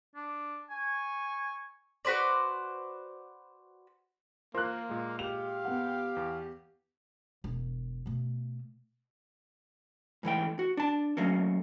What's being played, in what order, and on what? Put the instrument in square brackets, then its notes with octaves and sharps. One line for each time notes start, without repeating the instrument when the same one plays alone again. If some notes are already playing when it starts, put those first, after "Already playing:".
[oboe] D4
[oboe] G#5 [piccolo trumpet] C#6
[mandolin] F#4 B4 C5 D5
[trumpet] A#3 [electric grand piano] F4 A#4 C5 [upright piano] C6 F#6
[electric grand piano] A#2 G#3
[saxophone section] G4 [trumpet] F5 [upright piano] F7
[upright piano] B3 F#5
[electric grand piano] E2
[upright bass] E1
B2 A3
[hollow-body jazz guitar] G#2 E3 A3 G5
F#4
D4 A5
F#3 A3 A#3 C#4